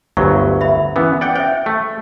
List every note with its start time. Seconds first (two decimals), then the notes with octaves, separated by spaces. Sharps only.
0.17 G1 D2 F#3 C#6
0.61 E5 B5
0.96 E3 B3 C#4
1.21 D5 F#5 G5
1.36 C5 E5 G5
1.66 A3